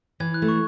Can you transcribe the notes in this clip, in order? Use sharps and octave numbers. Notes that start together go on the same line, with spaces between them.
E3 G#6
F#6
A3
C#6